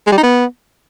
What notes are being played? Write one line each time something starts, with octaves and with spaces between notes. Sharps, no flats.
G#3
G3
D#4
B3